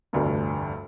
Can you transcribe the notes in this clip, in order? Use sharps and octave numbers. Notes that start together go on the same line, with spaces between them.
F1 D2 G2